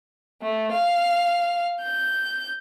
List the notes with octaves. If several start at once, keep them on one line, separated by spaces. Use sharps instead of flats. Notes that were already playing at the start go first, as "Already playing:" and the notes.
A3
F5
G6